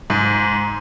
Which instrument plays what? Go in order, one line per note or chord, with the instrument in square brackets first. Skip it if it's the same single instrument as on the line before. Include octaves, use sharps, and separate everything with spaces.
[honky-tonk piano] G#2